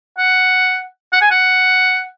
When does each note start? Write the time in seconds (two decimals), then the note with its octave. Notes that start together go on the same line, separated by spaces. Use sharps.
0.18 F#5
1.13 F#5
1.21 G#5
1.31 F#5